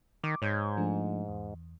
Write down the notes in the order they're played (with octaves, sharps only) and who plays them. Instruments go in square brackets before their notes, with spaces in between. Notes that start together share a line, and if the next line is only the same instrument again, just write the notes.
[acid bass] D#3 [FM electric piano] D6
[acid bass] G#2 [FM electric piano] C#5 G6 G#6
[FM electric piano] F3 A3 D4
E2